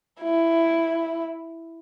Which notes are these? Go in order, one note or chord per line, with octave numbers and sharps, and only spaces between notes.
E4